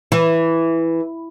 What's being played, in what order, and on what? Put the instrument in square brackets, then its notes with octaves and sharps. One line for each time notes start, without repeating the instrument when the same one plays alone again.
[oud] E3